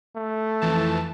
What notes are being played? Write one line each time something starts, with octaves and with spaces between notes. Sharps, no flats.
A3
F2 E3 A5